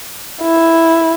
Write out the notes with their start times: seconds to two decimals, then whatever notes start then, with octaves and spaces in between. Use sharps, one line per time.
0.43 E4